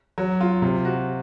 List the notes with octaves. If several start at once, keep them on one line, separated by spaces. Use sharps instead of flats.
F#3
F4
C3
F#4